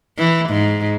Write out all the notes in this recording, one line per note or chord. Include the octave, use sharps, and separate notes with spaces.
E3
G#2